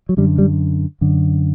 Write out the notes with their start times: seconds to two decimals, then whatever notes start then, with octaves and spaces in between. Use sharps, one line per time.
0.09 F#3
0.17 F#2 D3 G3
0.38 G3
1.01 F#2 D3